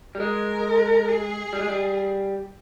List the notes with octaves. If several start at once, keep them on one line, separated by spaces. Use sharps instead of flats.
G3
G#3 A#4
G#4
G3
G#3
G3